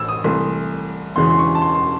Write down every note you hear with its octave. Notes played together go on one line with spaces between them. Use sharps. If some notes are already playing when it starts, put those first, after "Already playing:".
Already playing: A1 A2 E3 E6
D#6
C2 C3 E3 A3 C6
E1 E2 C#3 E3 G#3 C6
C6
C#6
A5
C6
C6